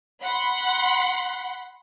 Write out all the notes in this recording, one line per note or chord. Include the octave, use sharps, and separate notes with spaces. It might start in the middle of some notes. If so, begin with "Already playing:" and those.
F#5 B5 C6